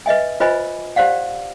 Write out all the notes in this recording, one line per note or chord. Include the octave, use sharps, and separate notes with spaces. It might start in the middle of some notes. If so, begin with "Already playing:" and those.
B4 D#5 E5 G#5
F4 B4 C5 D#5 G#5 B5
G4 C5 D5 F5 F#5